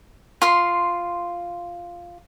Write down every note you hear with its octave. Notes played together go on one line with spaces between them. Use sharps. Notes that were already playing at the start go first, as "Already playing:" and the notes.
F4 C6